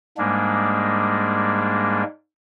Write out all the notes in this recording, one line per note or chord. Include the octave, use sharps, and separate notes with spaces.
G#2 G3 G#3 A#3 D4